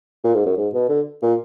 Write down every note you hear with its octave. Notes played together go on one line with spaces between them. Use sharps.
A#2
G#2
F#2
G#2
B2
D3
A#2